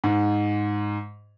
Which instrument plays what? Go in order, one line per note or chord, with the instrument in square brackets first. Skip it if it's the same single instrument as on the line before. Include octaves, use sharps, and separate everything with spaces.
[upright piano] G#2